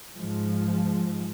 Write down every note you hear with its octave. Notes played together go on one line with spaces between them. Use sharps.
G#2 F3 G#3